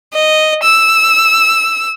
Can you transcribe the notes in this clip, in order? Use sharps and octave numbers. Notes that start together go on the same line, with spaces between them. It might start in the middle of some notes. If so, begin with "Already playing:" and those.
D#5
E6